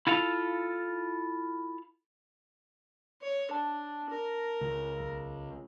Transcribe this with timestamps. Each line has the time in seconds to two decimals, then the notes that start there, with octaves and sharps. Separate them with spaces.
0.07 E4 F4 A4 F5
3.21 C#5
3.51 D4 A5
4.09 A#4
4.61 C#2
5.00 B1